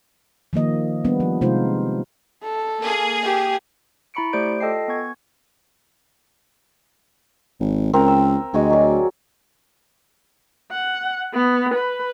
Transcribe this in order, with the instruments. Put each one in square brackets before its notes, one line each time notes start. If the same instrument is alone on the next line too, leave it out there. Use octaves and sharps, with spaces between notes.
[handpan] D#3 F3 A#3 D#5
G3 B3 D4
F3
C3 G#3 D#4 F4 C5
[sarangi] A4
[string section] A#3 G#4
[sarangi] G4
[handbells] E4 A#5 B5 C#6 C#7 D7
A3 G4 C5 D5 G6 D7
F4 A4 D#5 G5 A5 C7
B3 G#5 C#6 G#6
[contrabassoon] G#1
[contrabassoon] C#2 [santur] C4 A#4
[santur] E6
[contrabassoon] D2 [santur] G#3 F#4 G#4
[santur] F#3 D5
[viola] F#5
B3
B4